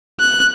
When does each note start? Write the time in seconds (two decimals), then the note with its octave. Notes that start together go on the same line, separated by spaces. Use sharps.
0.20 F#6